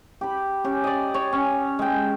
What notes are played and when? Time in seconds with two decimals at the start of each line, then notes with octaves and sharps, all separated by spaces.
0.21 G4 B5
0.64 C#4 G4
0.84 D5 D#5
1.14 C#5
1.33 C#4
1.79 G#3 G5